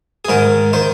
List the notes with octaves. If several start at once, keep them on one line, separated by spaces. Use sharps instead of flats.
G#4
G#2 D#3 A#4
D#3 C5